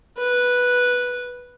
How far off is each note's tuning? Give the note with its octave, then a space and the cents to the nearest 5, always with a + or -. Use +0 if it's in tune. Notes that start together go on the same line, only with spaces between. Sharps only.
B4 -5